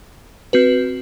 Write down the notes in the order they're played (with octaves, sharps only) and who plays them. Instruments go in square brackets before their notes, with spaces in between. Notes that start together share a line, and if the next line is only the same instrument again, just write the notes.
[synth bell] C4 F#4 B4